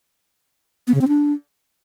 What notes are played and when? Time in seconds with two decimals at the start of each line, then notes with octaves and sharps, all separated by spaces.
0.87 B3
0.94 C#3
1.01 C4
1.08 D4